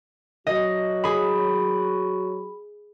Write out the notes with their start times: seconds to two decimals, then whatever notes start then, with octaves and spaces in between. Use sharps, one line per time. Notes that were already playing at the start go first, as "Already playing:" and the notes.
0.47 F#3 F#4 D#5
1.04 G#4 B5